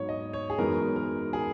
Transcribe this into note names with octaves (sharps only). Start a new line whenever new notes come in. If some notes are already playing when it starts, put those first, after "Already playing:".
Already playing: G#2 F#3 B3 D#4 C#5
D#5
C#5
G#4
F#2 E3 G#3 B3 D#4 A#4
A#4
G#4